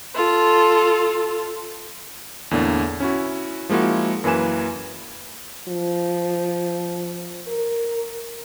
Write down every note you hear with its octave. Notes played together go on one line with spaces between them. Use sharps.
F4 A4
E2 A2 D3 A#3 D4
C#4 E4 F#4
F3 G#3 A#3 E4 F#4
F#2 E3 A#3 B4 G#5 E7
F3
A#4